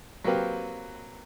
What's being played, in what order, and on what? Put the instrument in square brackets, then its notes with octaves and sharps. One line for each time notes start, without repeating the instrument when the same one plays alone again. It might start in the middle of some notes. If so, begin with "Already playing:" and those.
[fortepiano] F#3 A#3 C4 G4 B4 F5